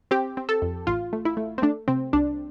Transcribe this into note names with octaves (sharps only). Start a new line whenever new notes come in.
C4 G4
C4
A4
F2
A1 F4
A3
E4
A3
C4
A3 D4
C3 C4
C2 D4